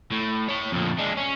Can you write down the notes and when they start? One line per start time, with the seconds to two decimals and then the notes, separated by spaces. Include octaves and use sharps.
0.12 A2
0.49 C#5 A5
0.72 F2 A#2
0.98 G#3 D4
1.17 C#4